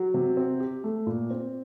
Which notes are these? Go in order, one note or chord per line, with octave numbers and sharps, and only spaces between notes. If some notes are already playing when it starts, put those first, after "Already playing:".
Already playing: F#3
C3
C4
G4
A3
A#2
C4